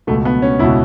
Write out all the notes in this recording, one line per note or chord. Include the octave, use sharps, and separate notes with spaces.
C#2 B2 A3
B3
C#4
C#2 B2 E4